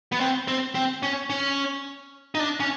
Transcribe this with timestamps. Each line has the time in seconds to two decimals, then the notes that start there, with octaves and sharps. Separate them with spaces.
0.12 B3
0.20 C4
0.48 C4
0.75 C4
1.03 C#4
1.30 C#4
2.35 D#4
2.40 D4
2.60 C#4